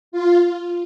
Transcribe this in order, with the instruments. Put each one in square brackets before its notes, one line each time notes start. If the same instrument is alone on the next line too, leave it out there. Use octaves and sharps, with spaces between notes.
[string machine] F4